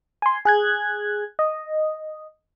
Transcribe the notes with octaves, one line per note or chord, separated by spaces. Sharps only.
G#5 C6
G#4 F#6 G#6
D#5